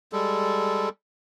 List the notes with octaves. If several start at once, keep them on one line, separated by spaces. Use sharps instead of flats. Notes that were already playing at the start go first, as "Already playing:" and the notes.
G3 G#3 A4